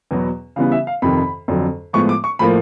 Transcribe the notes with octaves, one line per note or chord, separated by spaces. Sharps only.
E2 B2 F#3 B3
C#3 E3 G3 B3 F5
E5
F5
F2 C3 D#3 B5
F2 D3 F#3
A2 F3 G#3 B3 C#6
D6
C#6
A2 F3 A#3 B5